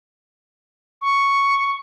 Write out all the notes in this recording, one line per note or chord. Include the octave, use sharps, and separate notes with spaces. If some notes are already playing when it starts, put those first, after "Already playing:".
C#6